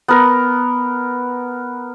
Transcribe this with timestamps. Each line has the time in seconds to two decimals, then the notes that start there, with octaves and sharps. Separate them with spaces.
0.08 B3 A#4